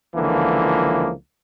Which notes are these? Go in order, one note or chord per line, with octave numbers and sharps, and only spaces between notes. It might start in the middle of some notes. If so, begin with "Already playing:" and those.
C#2 D3 E3 F3 A#3